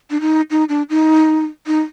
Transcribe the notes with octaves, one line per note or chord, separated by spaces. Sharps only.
D4
D#4
D#4
D4
D#4
D#4